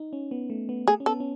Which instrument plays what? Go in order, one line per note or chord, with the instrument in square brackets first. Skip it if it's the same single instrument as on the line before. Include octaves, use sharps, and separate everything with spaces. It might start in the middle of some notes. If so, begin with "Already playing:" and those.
Already playing: [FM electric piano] D#4
C#4
B3
A3
B3
[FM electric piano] A3 [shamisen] G#4
[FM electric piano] C#4
[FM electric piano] B3 [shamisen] A4
[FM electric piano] C#4